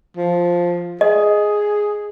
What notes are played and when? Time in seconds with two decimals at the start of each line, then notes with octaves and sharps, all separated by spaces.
0.17 F3
1.01 G#4 D#5